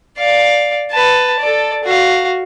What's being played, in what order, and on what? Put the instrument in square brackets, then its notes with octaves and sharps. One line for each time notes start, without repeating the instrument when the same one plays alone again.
[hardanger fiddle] D5 F5
B4 A5
A4 D5
F#4 F5